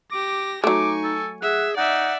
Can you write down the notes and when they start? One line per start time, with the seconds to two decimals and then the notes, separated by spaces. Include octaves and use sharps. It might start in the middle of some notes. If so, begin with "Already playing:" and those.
0.12 G4 D6 A#6
0.64 F#3 A3 D#4 G#5 C#6 D6
1.04 A4
1.42 G#4 E5 F#5
1.77 D#4 D5 E5 F#5